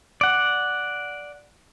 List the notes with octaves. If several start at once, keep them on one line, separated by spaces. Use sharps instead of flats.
D5 F#5